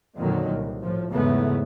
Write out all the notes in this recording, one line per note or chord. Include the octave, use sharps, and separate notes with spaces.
F2 A#2 D3 D#3 F#3
C2
A2 F3
E2 G#2 C#3 E3 A3 B3